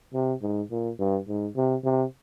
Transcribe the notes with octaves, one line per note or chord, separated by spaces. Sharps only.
C3
G#2
A#2
G2
G#2
C3
C3